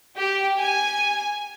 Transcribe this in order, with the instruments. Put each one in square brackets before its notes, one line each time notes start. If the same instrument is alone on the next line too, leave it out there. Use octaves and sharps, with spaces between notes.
[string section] G4
G#5